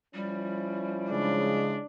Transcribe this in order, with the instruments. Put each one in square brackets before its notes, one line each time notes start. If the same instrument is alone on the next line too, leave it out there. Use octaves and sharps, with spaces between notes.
[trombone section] F3 C#4 E4 [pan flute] G3
[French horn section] C#3 G#3 [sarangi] D4